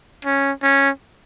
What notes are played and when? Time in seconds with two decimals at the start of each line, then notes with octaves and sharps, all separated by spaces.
0.25 C#4
0.63 C#4